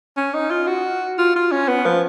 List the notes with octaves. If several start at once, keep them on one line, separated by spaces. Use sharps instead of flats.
C#4
D#4
F4
F#4
F4
F4
C#4
B3
F3